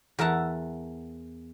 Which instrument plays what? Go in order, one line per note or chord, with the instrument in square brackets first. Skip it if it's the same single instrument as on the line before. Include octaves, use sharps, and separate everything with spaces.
[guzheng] E2 A#4 E5 F#5 A5